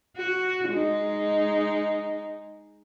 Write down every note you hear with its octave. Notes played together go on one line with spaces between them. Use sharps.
F#4
G#3 D#4